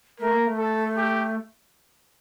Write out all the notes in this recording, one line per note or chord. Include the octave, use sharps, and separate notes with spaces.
A3 A#4
A#3
A3
A4
G4